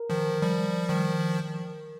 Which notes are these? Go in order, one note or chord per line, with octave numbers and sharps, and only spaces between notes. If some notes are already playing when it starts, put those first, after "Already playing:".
Already playing: A#4
D#3 F3
F3 G3
D#3 F3